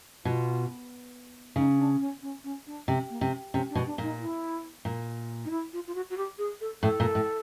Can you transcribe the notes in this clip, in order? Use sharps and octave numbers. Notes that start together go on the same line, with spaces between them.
B2 F4
C#3 D#4
D4
C#4
C#4
C#4
D4
C3 C4
A#3
C3
C3 C#4
D4
B2
D4
A#2 D#4
E4
A#2
D#4
E4
F4
F4
F#4
F#4
G4
G#4
A4
A2 A4
A#2
A2